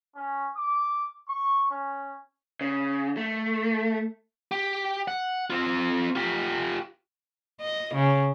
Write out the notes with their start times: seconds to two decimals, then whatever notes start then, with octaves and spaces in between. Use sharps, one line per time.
0.15 C#4
0.55 D6
1.28 C#6
1.70 C#4
2.61 C#3
3.17 A3
4.52 G4
5.08 F#5
5.50 C4 F4
6.16 F4 G4
7.61 D#5
7.95 C#3